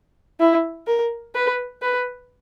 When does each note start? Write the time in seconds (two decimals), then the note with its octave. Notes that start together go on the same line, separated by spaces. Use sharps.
0.40 E4
0.87 A#4
1.35 B4
1.82 B4